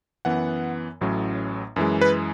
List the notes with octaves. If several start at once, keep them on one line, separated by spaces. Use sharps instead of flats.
F#2 E3 B3 F#5
A1 A2 F#3 C#4
F#2 E3 G#3
B4